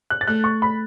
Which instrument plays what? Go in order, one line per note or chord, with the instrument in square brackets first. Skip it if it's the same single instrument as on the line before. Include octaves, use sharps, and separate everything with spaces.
[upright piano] F#6
A6
[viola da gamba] A3 [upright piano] F#6
[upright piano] C#6
B5